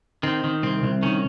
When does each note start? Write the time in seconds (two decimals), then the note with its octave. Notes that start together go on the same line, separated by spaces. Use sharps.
0.23 D#3 C4
0.44 D#3
0.63 C2 C4
0.83 C2
1.02 D#3 C#4